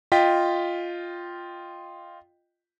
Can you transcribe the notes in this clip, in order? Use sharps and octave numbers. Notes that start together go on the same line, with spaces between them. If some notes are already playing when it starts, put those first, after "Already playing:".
F4 D#5 G5 B6